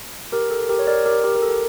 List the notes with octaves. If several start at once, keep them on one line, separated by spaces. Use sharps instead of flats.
G4 A#4
A4
G4 A#4
C#5
A#4 D5
G4 A#4
G4 A#4
A#4
A4